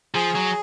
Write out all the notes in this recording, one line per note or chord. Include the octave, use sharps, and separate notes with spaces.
F3 G#4
F#3